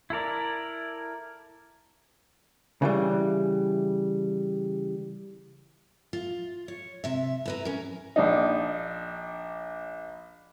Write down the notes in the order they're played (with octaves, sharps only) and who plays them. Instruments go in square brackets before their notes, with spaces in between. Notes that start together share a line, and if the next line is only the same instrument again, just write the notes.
[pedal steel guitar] E4 A4 A#4 D5
[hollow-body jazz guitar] C#3 E3 G3
[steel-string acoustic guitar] F4
C#5
C3 E5
E4 B4 A#5
C#4 A#4
[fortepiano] A#1 D4 D#4